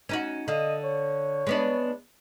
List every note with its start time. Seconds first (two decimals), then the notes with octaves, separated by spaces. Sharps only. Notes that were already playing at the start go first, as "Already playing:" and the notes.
0.09 C#4 D#4 F#4
0.48 D3 D#5 F5
0.84 C#5
1.47 G#3 B3 D4